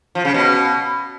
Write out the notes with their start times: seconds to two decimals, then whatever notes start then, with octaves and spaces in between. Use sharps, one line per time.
0.15 F3
0.25 C#3
0.34 B2